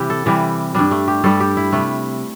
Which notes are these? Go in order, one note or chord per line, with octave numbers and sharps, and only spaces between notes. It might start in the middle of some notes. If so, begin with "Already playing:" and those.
Already playing: C3 E3 G3 E4 G4
A4
C3 E3 G3 G4
G2 G3 D4
A3
G4
G2 G3 A4
G4
E4
C3 G3 A3